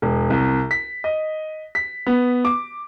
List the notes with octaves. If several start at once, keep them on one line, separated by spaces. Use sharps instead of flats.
E1
C2
B6
D#5
B6
B3
D6